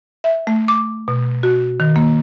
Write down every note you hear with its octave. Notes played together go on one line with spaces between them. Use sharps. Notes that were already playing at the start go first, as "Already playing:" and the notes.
E5
A3
D6
B2
F#4
D#3
A#3